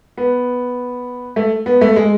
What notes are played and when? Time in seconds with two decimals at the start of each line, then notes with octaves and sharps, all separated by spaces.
0.18 B3
1.36 A3
1.66 B3
1.81 A3
1.96 G#3